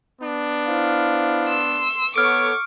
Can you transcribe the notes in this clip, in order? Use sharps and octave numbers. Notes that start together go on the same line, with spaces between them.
B3 D4
E4 C5 F5
C6 E6
B3 A4 C#5 F#5 C#6 D6 F6 D7